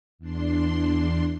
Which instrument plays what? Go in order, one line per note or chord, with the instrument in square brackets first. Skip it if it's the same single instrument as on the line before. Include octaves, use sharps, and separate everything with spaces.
[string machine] E2 D4 C6